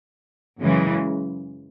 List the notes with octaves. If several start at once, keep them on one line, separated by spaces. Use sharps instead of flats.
F#2 C#3 E3 G#3